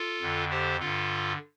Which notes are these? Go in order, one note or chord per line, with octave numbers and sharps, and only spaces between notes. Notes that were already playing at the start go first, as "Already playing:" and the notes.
Already playing: F4 A4
F2 D3
G4 C5
G2 D3 F4 A4